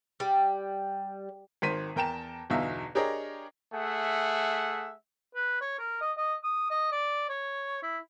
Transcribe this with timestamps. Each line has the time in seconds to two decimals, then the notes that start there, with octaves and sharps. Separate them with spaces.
0.20 G3
1.62 G#1 D#3 C5 B6 D#7
1.96 E2 A#4 G5 A5 E7
2.50 G1 E2 B2 D#4 E5 F5
2.95 D4 G4 G#4 A#4 C#5 D#5
3.72 A3 G#4 E5 F#5
5.35 B4
5.61 C#5
5.79 A#4
6.01 D#5
6.17 D#5
6.44 D#6
6.70 D#5
6.92 D5
7.29 C#5
7.82 E4